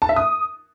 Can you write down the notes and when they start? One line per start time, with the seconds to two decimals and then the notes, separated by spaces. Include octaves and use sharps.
0.02 A5
0.09 E5
0.16 D#6